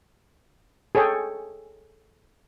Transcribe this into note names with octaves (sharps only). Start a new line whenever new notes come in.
G#4 A4 C#5 G5 G#5